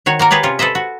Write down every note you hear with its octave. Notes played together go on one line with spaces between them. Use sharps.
D#3 F#4 C#5
A#3 F#4 A#4
G4 G#4 B4 C#5 D5
C3 C#4 F4
A4 B4 C5 D#5 E5
F#4